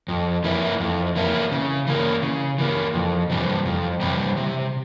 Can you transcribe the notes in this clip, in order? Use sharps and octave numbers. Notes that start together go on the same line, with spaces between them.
F2
E3 A#3 E4
F2
E3 A#3 E4
C#3
E3 A#3
C#3
E3 A#3
F2
C3 E3 G3
F2
C3 E3 G3
C3